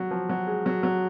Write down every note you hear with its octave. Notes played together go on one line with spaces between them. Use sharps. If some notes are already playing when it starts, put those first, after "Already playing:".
Already playing: F#3
F3
F#3
G#3
F#3
F#3